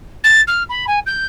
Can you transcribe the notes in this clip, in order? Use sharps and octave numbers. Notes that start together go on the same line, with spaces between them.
A6
F6
B5
G#5
G6